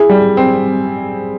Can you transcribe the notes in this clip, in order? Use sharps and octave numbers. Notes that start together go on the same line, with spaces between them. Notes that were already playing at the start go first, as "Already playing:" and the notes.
Already playing: E4 G#4
G3
C4